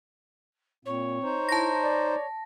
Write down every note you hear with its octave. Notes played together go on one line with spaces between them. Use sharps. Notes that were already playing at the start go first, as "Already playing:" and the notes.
A#2 C4 C#5
D#4 C5
E4 A5 A#6
D5